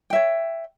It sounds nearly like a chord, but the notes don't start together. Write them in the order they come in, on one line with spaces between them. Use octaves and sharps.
G5 E5 C#5